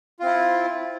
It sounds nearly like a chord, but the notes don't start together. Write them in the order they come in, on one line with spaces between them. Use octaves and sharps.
F4 C4 E4